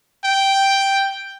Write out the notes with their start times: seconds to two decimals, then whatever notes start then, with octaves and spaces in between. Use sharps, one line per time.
0.24 G5